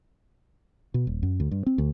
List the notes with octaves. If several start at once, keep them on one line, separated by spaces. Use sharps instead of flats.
B2
D#1
F#2
D2
G2
C4
D2